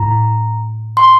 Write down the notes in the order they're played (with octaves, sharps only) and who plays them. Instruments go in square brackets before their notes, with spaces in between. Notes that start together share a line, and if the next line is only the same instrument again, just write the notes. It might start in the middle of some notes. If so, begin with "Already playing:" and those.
Already playing: [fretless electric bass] A2 [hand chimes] A#5
[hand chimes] C6